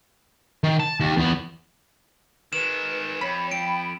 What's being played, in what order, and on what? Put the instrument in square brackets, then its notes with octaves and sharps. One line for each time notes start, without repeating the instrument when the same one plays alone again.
[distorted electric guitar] D#3
A5
D#2
E2 B3
[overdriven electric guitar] D#3 G#3 [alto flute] B4 [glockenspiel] E7
[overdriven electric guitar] F2 [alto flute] C#5 [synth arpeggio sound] B5
[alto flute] G5 [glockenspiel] D7